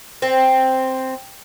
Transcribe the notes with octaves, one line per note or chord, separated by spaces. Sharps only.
C4